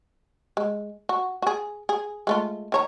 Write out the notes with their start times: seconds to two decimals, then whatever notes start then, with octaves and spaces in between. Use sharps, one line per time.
0.57 G#3
1.09 F#4
1.42 F#4 G#4
1.89 G#4
2.27 G#3 A3 F4
2.72 D#3 C#5 A#5